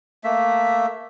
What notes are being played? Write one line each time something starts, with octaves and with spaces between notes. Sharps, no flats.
A3 A#3 E5